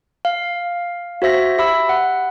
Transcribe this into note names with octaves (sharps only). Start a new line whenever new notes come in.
F5
F#4 C5 E5 A#6
G4 E5 B5 E6
F#5